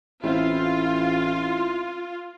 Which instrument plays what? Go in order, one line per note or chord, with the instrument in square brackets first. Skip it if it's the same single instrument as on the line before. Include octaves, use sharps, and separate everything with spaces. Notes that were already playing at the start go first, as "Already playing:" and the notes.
[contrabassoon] A1 [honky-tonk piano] C4 E4 [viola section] F4